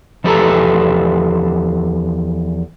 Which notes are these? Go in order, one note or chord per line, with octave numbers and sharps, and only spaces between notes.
E2 F3 G4 A4 B4 A#5